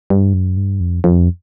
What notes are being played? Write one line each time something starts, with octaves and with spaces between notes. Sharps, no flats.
G2
F#2
G2
F2
F2